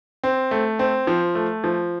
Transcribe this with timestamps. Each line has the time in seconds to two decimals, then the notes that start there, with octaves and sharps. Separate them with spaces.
0.24 C4
0.51 A3
0.79 C4
1.07 F3
1.35 A3
1.64 F3